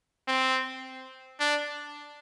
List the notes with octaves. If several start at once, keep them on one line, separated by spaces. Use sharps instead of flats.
C4
D4